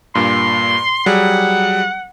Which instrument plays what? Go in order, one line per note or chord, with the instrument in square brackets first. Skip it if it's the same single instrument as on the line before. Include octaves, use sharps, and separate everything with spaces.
[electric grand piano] G2 A#2 [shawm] C6
[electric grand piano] F#3 G3 G#4 [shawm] F#5